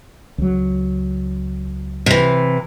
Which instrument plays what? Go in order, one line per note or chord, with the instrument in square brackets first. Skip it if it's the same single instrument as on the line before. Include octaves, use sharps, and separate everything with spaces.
[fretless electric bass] C#2 F#3
[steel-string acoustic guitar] C3 E3